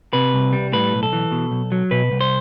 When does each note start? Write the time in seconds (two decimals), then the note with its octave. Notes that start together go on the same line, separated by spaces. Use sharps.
0.13 C3 B4
0.34 C2
0.53 G3
0.73 A2 B4
0.93 B1
1.03 A4
1.13 E3
1.32 B2
1.51 B1
1.72 F#3
1.91 B2 B4
2.11 C2
2.21 C5